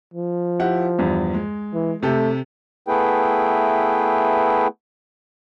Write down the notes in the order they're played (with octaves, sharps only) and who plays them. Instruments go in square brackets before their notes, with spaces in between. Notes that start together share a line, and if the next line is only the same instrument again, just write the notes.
[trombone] F3
[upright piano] E4 G4 F#5
E2 G2
G#3
[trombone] E3
[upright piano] C3 G4 A4 [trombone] A3
[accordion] A3 B3 E4 G#4 B4 G5